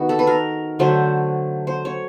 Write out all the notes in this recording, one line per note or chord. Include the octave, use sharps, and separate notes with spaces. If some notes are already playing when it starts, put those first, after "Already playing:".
Already playing: D#3 B3 F#4
A4
B4
A#4
D3 F#3 A3 C5
C5
C#5